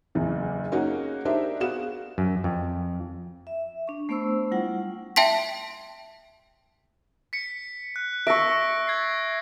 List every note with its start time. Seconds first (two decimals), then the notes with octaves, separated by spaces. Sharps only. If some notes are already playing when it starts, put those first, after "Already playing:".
0.15 F#1 E2 E3
0.72 A#3 C#4 D#4 F#4 G#4
1.25 D4 D#4 G4 A#4 C5 E5
1.60 B3 F#4 G#4 F5 E7
2.18 F#2
2.44 F2
3.47 E5
3.88 D4 C#6
4.09 A3 B3 D4 C5 C#6 E6
4.52 G3 E4 F4 F#5
5.16 E5 G5 A5 C6 B6
7.33 B6 C#7
7.96 F#6
8.27 E5 C#6 E6 A#6 D7
8.87 G#6 A6 C7